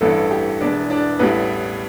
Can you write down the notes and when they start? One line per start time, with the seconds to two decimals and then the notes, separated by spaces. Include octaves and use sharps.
0.01 A1 G2 E3 A3 A4
0.31 G4
0.60 E1 E2 E3 D4 D5
0.90 D4 D5
1.19 A1 A2 G3 B3 B4